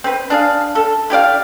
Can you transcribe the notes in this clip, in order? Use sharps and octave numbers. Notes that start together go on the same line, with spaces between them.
C4 B4
D4 G#4 F5
A4
E4 G4 D5 F5